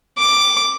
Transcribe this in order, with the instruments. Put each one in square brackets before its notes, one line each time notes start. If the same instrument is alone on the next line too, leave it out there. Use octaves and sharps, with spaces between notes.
[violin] D6